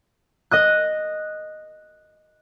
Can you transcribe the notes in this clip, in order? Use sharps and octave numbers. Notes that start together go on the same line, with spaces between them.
D#5 D#6 F#6